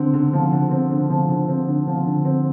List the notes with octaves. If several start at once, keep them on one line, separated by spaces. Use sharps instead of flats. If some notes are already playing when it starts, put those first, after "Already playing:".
Already playing: D3 C4
D3
F3
D3
C4
D3
F3
D3
C4
D3
F3
D3
C4